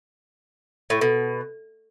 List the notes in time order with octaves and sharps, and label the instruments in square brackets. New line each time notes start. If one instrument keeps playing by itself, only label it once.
[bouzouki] A2
B2